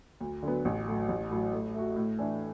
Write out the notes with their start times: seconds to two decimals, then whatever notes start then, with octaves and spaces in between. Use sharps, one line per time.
0.21 D2
0.43 D3 F#3 B3
0.65 A1
0.87 A2 F#3
1.08 A1
1.31 A2 F#3
1.53 A2
1.74 A3 F#4
1.96 A2
2.19 E3 D4